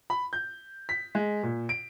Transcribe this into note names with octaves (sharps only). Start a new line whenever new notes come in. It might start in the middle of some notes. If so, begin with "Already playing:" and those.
B5
G6
B6
G#3
A#2
D7